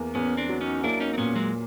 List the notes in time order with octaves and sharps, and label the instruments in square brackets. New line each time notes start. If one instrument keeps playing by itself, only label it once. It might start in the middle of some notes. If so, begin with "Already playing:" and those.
Already playing: [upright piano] E2 A#3
[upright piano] E2 [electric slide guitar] B3 C#4
[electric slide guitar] C4 D4
[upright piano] F#3
[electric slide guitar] C#4 D#4
[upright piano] A#3 [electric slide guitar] D4 E4
[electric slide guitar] C#4 D#4
C4
[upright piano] A#2 [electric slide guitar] B3 C#4
[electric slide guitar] F#3 G#3